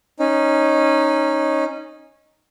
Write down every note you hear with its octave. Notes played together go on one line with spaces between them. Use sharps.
C#4 D#4